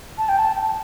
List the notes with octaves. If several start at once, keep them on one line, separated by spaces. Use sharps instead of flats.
A5
G5
A5